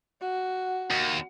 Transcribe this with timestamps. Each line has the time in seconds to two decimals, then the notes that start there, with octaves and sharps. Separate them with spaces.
0.21 F#4
0.91 D#2